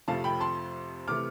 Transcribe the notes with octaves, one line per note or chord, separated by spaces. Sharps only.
F2 C3 F3 A3 F5 A5
G5 B5
A5 C6
C3 E3 A3 D6 F6